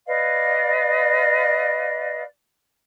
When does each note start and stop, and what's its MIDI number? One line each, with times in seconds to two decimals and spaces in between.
0.06 2.22 71
0.06 2.22 74
0.06 2.22 75
0.06 2.22 77